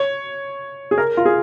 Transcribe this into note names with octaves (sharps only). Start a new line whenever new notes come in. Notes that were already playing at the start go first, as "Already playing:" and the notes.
Already playing: C#5
G#4
A#4
F4
G#4